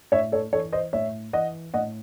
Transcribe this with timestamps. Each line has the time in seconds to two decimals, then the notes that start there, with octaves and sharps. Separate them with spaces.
0.12 A2 C#5 E5
0.32 A4 C#5
0.52 E3 A4 C#5
0.72 C5 D#5
0.93 A2 C#5 E5
1.33 E3 D#5 F#5
1.74 A2 D#5 F#5